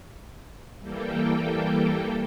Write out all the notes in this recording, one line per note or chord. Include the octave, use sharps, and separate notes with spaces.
E3 G3 A#3 A4 G5